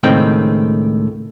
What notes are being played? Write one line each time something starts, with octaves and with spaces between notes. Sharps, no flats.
C#2 A2 D#3 C4 G5